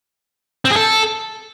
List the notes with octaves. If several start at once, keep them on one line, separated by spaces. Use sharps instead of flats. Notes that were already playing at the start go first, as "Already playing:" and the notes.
C4
G#4
A4